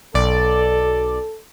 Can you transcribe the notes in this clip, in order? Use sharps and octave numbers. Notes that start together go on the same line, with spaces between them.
B1 A4 D5